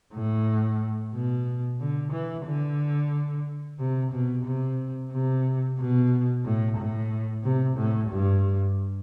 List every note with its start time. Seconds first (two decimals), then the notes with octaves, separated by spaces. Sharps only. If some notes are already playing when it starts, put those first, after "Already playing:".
0.14 A2
1.14 B2
1.80 D3
2.13 E3
2.47 D3
3.79 C3
4.12 B2
4.45 C3
5.12 C3
5.78 B2
6.45 A2
6.77 A2
7.43 C3
7.77 A2
8.10 G2